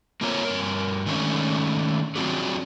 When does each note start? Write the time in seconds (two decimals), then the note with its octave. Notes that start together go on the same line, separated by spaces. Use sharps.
0.21 A#3 C4 F4 A#4 C#5 A#5
0.45 G2 A#4
1.06 D#3 G#3 A3 B3 C#4 D4
2.16 F#3 C4 D4 F4 F#4 G#4